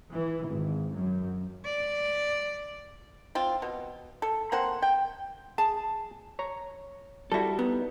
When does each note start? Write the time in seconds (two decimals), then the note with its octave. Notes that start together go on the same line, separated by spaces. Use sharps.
0.12 E3
0.46 G#1
0.94 F#2
1.65 D5
3.35 C4 F4
3.62 B2
4.22 A4
4.52 A#3 C4 C5 F#5
4.82 G5
5.58 G#4 A5
6.39 C#5 A#5
7.32 G3 E4 F#4 A4
7.59 B3 D#4